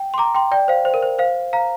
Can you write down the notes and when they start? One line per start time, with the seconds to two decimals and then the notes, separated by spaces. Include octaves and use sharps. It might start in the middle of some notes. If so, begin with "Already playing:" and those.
Already playing: G5
0.14 C6
0.18 A#5 D6
0.35 G5 C6
0.51 D5 G5
0.68 C5 F5
0.85 C5
0.94 A#4
1.03 C5
1.19 C5 F5
1.53 F5 A#5